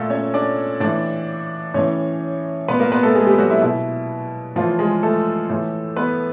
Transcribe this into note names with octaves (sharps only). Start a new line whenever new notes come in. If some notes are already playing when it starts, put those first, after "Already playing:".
Already playing: A#2 A3 A4
C#4 C#5
D4 D5
A2 E3 D4 D5
A2 E3 C#4 C#5
A#2 B3 B4
A#3 A#4
B3 B4
A3 A4
G#3 G#4
G3 G4
F#3 F#4
E4
B2 E4
A2 E3 F3 F4
G#3 G#4
A3 A4
A2 E3
B3 B4